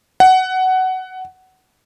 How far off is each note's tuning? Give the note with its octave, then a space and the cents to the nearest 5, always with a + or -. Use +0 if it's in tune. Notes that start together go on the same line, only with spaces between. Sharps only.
F#5 +15